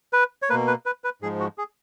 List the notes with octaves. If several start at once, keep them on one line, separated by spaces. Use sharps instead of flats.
B4
C#5
B2 A#3 B4
B4
B4
B4
G#2 F3 G#3 G#4
F#4
G#4